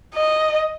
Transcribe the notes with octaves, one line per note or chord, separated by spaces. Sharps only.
D#5